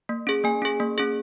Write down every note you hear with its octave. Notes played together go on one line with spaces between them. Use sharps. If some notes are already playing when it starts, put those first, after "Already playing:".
A#3
C#4 G#4
A#3 G#5
C#4 G#4
A#3
C#4 G#4